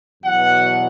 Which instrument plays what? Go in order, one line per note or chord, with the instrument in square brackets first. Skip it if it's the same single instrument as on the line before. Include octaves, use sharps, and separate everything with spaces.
[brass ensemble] E2 B2 F#3 F#5